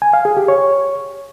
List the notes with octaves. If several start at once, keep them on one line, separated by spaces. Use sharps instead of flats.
G#5
F5
G#4
G4
C#5